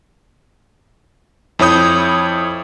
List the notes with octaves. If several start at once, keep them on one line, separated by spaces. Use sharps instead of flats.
F2 E4 C#5 D#6 G6